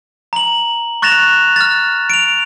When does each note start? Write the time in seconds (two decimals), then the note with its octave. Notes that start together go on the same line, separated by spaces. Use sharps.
0.33 A#5 F#7
1.02 C#6 F#6 A6 A#6 E7 F7
1.56 F6 A6
2.10 D7 F7